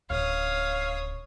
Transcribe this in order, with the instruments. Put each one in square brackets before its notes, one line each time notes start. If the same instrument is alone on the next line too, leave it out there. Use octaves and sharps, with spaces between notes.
[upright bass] D1 C#3 [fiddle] C#5 D#6 [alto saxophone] F5